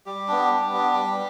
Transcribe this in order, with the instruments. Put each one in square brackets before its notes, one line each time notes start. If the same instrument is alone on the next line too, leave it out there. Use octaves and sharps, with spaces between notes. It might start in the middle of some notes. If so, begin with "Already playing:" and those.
[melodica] G3 G4
B3 D4
G3
B3 D4
G3